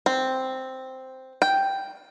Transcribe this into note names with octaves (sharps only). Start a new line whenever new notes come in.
C4
G5